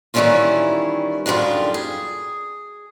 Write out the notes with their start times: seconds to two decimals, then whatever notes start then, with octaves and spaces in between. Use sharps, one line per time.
0.14 D#3 E3 G3 C#4 E4 F4
1.26 F#2 D3 D#3 G3 F4
1.74 G#4